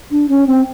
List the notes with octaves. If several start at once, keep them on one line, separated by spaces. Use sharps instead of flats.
D4
C#4
C4